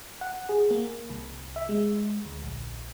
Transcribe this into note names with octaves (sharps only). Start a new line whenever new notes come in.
F#5
G#4
A#3
C2
E5
G#3
D2
A#1